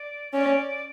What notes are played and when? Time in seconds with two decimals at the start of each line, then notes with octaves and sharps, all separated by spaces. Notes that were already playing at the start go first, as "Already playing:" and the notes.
Already playing: D5
0.33 C#4 D5